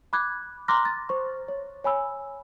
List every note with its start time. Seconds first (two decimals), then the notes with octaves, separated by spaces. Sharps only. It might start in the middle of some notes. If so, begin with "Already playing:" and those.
0.13 B5 D6 F#6 G#6
0.68 A#5 C6 D6 F6 F#6 A#6
0.85 A6
1.09 C5 C#6
1.48 C#5
1.84 C#5 G#5 B5 E6